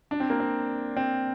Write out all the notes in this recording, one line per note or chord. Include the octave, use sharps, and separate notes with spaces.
D4
C4
A#3
C4
C4